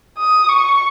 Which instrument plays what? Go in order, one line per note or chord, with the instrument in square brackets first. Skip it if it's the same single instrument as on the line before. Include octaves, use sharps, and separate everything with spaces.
[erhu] D#6
C#6